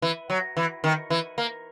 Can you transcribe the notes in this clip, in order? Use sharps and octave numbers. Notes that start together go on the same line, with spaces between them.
E3
F#3
E3
D#3
E3
A#3